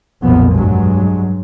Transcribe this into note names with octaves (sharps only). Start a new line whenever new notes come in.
B1 F2 A#2 F3 B3
G2 F#3 G#3